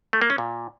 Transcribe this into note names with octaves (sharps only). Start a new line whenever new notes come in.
A3
A#3
C#4
A#2